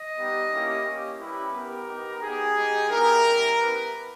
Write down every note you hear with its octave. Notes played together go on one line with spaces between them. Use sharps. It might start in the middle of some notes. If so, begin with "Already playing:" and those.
Already playing: D#5
G3 B3 D#4 G4
A#3 C#4 E4 G4
A#3 C#4 G4
G3 C#4 E4 G4 B4
B3 G4 A#4
B3 D#4 G4
B3 D#4 G4 G#4
G#3 D#4 G4
B3 E4 G4 A#4
G3 C#4 E4 G4
B3 E4 G4 B4